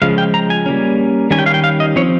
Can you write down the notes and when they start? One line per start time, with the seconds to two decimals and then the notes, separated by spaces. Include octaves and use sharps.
0.02 C#3 F3 G#3 F5
0.18 G5
0.34 A#5
0.50 G#5
0.66 G3 A#3 C#4
1.31 D#3 G3 C#4 G#5
1.39 G5
1.46 F5
1.54 G5
1.64 F5
1.80 D#5
1.96 F3 C4 C#5